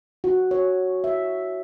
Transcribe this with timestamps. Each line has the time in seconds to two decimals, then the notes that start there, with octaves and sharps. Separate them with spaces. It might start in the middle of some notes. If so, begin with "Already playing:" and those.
0.24 F#4
0.51 C#5
1.04 E5